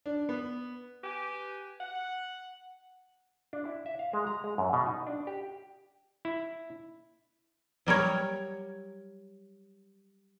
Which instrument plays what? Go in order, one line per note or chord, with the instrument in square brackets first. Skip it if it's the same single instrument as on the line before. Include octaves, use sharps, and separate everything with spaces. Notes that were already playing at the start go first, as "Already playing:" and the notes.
[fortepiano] D4
B3
[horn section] G4 B4 G5 G#5
F#5
[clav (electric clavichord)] D4
E4
E5
F5
G#3
A#5
G#3
F#2
B2
D#4
D4
G4
E4
[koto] F#3 G3 A#4 C#5